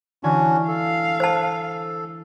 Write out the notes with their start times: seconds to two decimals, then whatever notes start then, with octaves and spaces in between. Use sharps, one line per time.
0.23 D3 E3 C#4 D4 F#4 G#5
0.68 A4 F5
1.20 C5 A5